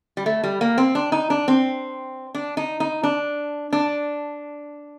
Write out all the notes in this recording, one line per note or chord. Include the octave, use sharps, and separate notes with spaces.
G3
A3
G3
A#3
C4
D4
D#4
D4
C4
D4
D#4
D#4
D4
D4